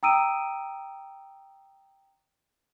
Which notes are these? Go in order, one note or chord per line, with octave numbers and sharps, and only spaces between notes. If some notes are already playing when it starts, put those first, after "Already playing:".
G5 A#5 D#6 E6 D7 D#7